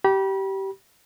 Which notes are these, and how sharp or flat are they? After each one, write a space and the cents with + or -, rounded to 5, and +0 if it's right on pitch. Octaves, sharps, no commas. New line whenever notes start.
G4 -20 B5 -35